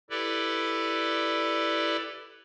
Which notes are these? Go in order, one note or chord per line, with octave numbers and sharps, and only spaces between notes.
E4 G4 A4 B4 D5